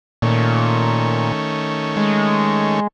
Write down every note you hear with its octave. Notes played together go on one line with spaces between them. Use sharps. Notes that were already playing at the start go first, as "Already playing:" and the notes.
A#2 D#3 A3 C#4
G#3